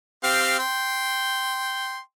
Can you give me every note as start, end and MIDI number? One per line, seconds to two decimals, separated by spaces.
0.24 0.59 60
0.24 0.59 67
0.24 0.59 77
0.59 1.99 79
0.59 1.99 84